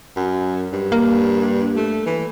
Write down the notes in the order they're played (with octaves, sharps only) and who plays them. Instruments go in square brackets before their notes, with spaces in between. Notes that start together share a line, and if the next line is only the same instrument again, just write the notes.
[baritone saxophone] F#2
G2
[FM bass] A#3
[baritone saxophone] A3
E3